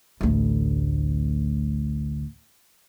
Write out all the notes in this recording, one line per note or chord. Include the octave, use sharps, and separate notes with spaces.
A1 D2